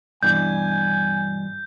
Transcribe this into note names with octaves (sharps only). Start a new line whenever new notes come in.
G2 B2 E3 G#5 G6